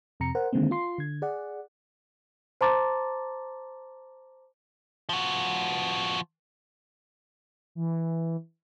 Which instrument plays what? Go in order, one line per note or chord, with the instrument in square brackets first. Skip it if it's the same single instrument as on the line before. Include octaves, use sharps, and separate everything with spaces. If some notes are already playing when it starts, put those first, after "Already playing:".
[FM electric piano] F2 C3 A#5 C#7
A#4 C5 F#5
D3 D#3 G#3 A#3 C4
F4 C6 C7
D3 G#6
G#4 D5 F#5
[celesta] C5 A5 A#5 C6 D6 A6
[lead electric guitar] F3 F#4
[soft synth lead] E3